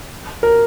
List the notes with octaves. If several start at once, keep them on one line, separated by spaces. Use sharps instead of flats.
A#4